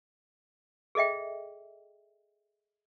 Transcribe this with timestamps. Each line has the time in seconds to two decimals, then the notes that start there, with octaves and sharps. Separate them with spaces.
0.95 G#4 A4 D#5 E5 G5